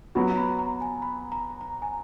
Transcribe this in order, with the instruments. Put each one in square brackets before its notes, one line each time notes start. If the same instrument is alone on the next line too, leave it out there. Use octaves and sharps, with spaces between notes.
[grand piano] F#3 B3 F#4 [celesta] B5
[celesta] B5
A#5
G#5
B5
A#5
A#5
G#5